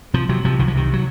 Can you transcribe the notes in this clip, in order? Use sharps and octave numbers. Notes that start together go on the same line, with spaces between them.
C3 F3
C3 F#3
C3 F3
C2 D#3
F3
C3 D#3
F#3